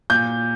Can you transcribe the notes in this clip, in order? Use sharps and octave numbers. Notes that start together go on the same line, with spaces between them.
A#2 G6